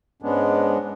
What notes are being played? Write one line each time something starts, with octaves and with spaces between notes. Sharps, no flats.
G#2 G#3 B3 C#4 D4